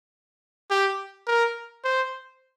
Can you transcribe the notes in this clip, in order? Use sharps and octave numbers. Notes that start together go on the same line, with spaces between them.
G4
A#4
C5